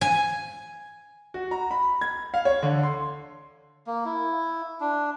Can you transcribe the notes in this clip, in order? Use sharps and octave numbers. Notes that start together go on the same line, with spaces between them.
G#5
F#4
A#5
B5
G#6
F5
C#5
D3
C6
A#3
E4
D4